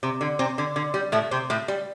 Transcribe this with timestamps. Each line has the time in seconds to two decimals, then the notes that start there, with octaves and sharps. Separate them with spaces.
0.03 C3
0.21 D3
0.39 C3 C4
0.58 D3
0.76 D3
0.94 G3
1.12 A2 A3
1.31 C3 C4
1.50 A2 A3
1.68 G3